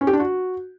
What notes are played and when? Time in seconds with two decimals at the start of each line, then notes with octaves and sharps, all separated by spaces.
0.01 C#4
0.07 G4
0.13 D4
0.20 F#4